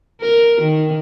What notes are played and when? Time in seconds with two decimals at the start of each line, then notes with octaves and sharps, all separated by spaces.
0.21 A#4
0.61 D#3